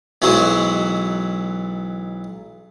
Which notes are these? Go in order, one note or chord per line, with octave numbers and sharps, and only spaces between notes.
B1 E3 F#3 G#3 F#4 C5